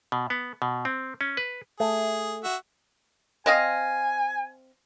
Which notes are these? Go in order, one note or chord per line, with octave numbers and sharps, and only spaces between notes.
B2
B3
B2
C4
C#4
B4
A3 G#4
F#4 E5
C4 D#5 F5 G#5